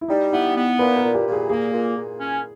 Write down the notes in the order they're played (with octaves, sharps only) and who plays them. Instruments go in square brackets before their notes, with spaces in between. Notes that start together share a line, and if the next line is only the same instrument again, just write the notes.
[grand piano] E4
[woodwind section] G3 [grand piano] D#4
[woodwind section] B3 [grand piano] E4
[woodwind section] B3
[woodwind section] A#2 [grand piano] B4
[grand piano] A#4
[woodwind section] A#2
[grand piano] G4
[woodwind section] A#2
[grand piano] G#4
[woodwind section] A#3 [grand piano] G#4
[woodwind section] A#2
A#2
C#4